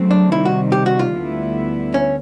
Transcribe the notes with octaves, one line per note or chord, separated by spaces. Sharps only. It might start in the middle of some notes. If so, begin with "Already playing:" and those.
Already playing: C#3 F#3 A3 C4
D4
C3 D#3 G3 E4
F#4
G4
F#4
F4
D2 D3 G3 B3 E4
C#4